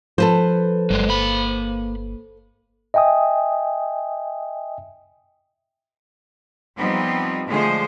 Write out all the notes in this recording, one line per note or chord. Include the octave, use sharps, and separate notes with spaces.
F3 A4 B4 C5
G1 F#3 G#3
A#3 B5
D#5 E5 G5 G#5 D#6
F3 G3 B3 C4 D#4
D3 F3 G#3 A3 G#4 C5